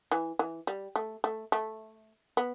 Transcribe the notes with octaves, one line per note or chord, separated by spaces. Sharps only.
E3
E3
G3
A3
A3
A3
B3